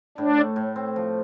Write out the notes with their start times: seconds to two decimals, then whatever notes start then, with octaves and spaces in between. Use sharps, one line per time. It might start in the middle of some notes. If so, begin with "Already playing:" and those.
0.18 A2 D4
0.37 A3
0.56 A2
0.76 C4
0.96 F3